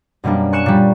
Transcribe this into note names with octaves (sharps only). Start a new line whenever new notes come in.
F#2 B2 G3 A#3 D4
G#5 C#6 F#6 C#7 E7
A#2 G3